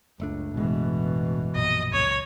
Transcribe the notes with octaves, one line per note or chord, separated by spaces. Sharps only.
F#1 C#2 A3 D4
A1 B2 E3 G#3
A#1 F#2 A#2 D#5
C#2 C#5